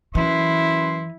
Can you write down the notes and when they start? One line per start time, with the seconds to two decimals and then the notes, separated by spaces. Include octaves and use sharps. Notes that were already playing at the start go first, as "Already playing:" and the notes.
0.15 F#2 E3 E4 B4 C6